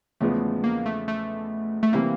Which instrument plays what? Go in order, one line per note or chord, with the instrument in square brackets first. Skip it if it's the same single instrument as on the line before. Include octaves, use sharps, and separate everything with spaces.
[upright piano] E2 C#3 F3 G#3 B3 [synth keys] A3
[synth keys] A#3
A3
A3
A3
[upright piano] C3 E3 G3 C4 E4 [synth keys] A#3